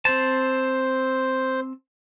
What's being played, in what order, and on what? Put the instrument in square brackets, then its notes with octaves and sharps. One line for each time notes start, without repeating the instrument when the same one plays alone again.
[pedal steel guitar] C4 A5 [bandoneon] C5